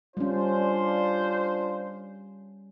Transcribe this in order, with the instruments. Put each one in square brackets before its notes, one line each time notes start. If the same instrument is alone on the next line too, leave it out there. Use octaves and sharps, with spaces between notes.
[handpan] G3 C#4 [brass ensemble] D4 F4 C5